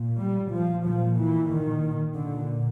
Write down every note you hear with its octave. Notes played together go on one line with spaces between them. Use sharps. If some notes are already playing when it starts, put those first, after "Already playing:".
Already playing: A#2
G3
F3
A#2 F3
E3
D#3
A#2 D3